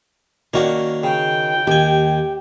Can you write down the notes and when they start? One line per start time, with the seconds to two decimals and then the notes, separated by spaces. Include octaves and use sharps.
0.54 D#3 A#3 C#4 D4 F#4 F#5
1.04 C#3 G5
1.67 D#2 G4 G#5